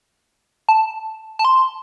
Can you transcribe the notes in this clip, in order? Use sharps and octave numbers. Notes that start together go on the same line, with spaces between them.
A5
A5
C6